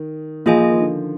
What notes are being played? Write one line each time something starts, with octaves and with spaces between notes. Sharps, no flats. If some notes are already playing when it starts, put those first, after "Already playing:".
Already playing: D#3
F3 A#3 F4 G#4 D#5 G#5
F3
D#3
D3